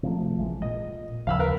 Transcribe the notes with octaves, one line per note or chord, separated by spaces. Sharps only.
C3 F3 A3
A#1 E3 G#3
A#2 D#5
D#2 C#3 F3 F5 B5 E6
A#4 B4